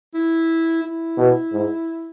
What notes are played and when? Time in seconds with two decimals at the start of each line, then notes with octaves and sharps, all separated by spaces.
0.14 E4
0.83 E4
1.17 B2
1.52 G#2